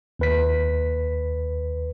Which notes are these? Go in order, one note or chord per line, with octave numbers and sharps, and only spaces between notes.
D#2 B4 B6